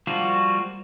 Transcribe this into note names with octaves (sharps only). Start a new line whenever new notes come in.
F3 G3 A#3 F4 F#4